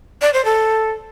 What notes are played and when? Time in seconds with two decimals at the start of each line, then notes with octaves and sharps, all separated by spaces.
0.22 D5
0.33 C5
0.45 A4